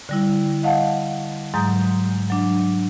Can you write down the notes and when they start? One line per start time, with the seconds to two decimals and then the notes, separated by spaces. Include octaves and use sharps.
0.09 D3 G3 E4
0.63 D#5 F5 F#5 A5
1.54 G#2 F#3 G#3 A#5 D#6 G6
2.30 F#3 D4